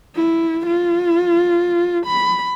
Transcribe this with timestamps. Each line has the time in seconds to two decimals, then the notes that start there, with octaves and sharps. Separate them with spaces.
0.15 E4
0.66 F4
2.06 B5